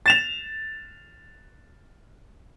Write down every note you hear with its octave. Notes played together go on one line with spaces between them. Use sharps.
A6 E7 F7